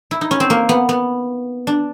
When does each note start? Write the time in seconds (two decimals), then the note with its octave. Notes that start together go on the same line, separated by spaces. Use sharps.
0.11 E4
0.21 D#4
0.31 C#4
0.40 C4
0.50 A#3
0.69 B3
0.89 B3
1.67 D4